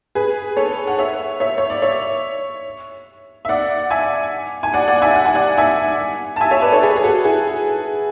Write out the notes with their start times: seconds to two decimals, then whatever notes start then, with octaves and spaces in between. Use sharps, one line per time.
0.15 G#4 B4
0.57 A4 C#5
0.87 F#5
0.99 C#5 E5
1.40 C#5 E5
1.58 C#5
1.70 D5
1.82 C#5 E5
3.45 E5
3.49 D5 F#5
3.90 E5 G#5
4.63 G#5
4.74 D5 F#5
4.88 D5 F#5
5.02 E5 G#5
5.15 F#5
5.25 G#5
5.35 D5 F#5
5.58 E5 G#5
6.36 A5
6.41 E5 G#5
6.51 C#5 E5
6.61 B4 D5
6.72 A4 C#5
6.83 G#4 B4
6.96 G#4
7.03 F#4 A4
7.24 E4 G#4